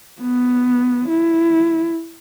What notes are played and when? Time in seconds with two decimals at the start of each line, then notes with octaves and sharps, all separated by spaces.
0.21 B3
1.09 E4